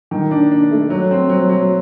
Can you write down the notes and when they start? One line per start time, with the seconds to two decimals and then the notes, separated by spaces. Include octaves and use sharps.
0.11 D#3
0.31 D4
0.52 D4
0.71 A3
0.90 F#3
1.11 C4
1.30 F#3
1.49 F#3